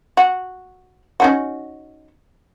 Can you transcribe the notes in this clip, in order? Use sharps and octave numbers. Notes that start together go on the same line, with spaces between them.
F#4
C#4 D#4 F#4